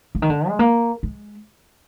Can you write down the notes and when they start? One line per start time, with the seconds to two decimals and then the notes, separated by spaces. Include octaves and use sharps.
0.15 D3
0.22 D#3
0.30 D3
0.48 G#3
0.59 A#3
1.03 G#3